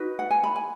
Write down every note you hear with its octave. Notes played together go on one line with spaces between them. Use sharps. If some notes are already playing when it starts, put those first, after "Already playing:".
Already playing: D#4 F#4 B4
F#5
G#5
B5
G#5